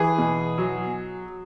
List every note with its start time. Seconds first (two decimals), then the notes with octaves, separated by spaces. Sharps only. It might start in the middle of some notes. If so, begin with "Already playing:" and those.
Already playing: E3 G#4
0.18 B2
0.58 F#3